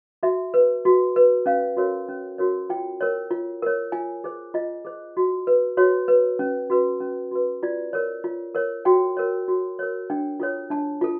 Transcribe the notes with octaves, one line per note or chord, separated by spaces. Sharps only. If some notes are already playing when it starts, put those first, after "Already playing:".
F#4 E5
B4
F#4
B4
C#4 F5
F#4 A#4 C#5
C#4
F#4 A#4 C#5
F4 G5
A#4 C#5
F4
A#4 C#5
F4 G#5
G#4 C5
F4 D#5
G#4 C5
F#4
B4
F#4 C#5
B4
C#4
F#4 B4
C#4
F#4 B4
F4 D5
A#4 C#5
F4
A#4 C#5
F#4 G5
A#4 C#5
F#4
A#4 C#5
D4 G5
F4 A4 C#5
D4 A5
F4 A4